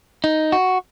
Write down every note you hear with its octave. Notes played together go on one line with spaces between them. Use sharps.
D#4
F#4